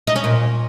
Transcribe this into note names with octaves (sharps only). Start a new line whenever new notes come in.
D#4
C#4
A#2